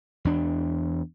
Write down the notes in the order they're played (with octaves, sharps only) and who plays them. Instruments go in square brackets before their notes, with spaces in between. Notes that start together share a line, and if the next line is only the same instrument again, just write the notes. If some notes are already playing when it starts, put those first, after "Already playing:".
[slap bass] E2 D4